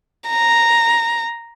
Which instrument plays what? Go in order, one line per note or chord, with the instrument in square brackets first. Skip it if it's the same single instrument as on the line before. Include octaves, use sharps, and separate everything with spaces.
[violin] A#5